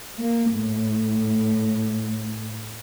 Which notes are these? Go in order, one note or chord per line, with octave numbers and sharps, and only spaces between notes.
A#3
A2